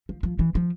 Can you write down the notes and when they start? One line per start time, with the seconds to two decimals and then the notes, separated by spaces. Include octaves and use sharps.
0.09 F3
0.23 F3
0.39 E3
0.55 F3